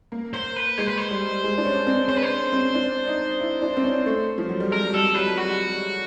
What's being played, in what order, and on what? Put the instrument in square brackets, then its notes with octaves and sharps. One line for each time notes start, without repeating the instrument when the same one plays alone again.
[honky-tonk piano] A#3
[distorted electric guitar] C5
B4
[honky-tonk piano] G#3 [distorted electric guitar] C5
[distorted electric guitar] B4
C5
[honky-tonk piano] G3
G#3
D4
C#4
C4
[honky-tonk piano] C#4 [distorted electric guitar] C5
[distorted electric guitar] B4
C5
[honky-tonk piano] C4
D4
D#4
E4
D4
C4
C#4
A3
F3
F#3
G3
[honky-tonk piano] G#3 [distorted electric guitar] A#4
[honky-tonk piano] G3 [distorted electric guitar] A4
[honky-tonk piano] F#3 [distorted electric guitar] B4
[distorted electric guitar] F#4